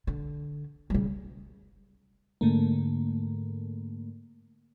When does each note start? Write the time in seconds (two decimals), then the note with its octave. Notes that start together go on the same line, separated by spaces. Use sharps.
0.07 D3
0.90 C#3 G3
2.41 G#2 D3 A3 A#3